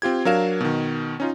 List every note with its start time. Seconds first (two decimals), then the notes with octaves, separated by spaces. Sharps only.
0.02 C4 F4 G4 G#6
0.25 F#3 D4 A#4 F5 E7
0.61 B2 D#3
1.20 C#4 D#4 F4